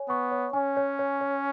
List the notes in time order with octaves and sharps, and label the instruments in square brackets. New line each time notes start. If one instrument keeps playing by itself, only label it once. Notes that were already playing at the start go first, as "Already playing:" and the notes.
Already playing: [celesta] C#5 G#5
[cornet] B3 [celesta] C#6
[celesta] C#5
[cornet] C#4 [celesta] G#5
[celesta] C#5
C#5
C#5